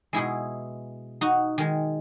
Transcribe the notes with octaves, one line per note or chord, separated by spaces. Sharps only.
B2 G#3 E4 G#4
D#4 F#4
D#3 G#3